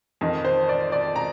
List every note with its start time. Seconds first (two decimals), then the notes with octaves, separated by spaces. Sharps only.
0.21 F2 D#3 D#5
0.45 C5
0.69 D5
0.92 D5
1.16 A#5